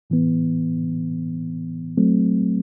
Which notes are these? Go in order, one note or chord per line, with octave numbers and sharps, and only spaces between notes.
A2 E3 B3
F#3 A3 C4